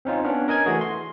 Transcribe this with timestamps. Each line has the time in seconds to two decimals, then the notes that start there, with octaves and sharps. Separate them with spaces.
0.05 C4 C#4 D#4 F4
0.24 B3 C#4 D4
0.48 A#4 D#5 G#5 G#6
0.66 E3 A3 F#4 G#4
0.81 C6